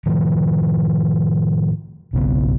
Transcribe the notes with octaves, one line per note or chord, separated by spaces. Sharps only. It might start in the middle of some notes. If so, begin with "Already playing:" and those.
A2 D#3 F3
B1 G2 C#3 B3